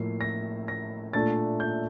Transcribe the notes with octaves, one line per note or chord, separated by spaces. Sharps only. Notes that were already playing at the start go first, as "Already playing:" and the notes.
Already playing: A2 F3 A#3 C7
A#6
A#6
A#2 A3 D4 A6
G6